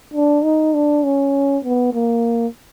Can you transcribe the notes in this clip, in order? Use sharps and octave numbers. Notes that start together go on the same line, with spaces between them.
D4
D#4
D4
C#4
B3
A#3